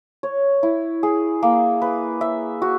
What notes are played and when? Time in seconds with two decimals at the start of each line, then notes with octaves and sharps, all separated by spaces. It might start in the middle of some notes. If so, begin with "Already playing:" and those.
0.23 C#5
0.63 E4
1.03 G#4
1.43 A#3
1.82 B4
2.21 E5
2.62 F#4